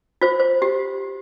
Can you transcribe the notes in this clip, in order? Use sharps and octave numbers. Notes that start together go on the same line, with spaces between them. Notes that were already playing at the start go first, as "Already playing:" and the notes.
F4 C5
C5
G4